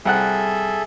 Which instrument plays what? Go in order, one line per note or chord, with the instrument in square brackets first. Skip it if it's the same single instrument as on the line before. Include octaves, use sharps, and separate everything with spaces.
[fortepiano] C2 F#5 F#6 [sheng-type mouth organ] G#4 A4 E5